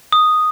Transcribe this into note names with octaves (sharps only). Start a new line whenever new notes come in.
D#6